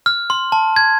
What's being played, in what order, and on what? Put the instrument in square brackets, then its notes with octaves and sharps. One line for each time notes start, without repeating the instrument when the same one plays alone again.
[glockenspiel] F6
C6
A5
G#6